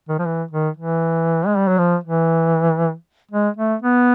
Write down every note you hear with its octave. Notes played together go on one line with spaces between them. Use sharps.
D#3
F3
E3
D#3
E3
G#3
G3
F#3
F3
E3
G#3
A3
B3